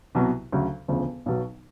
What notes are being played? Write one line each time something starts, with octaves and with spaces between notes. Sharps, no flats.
C2 B2 F#3 B3
D2 C#3 F#3
E1 D2 C#3 F3
B1 B2 F#3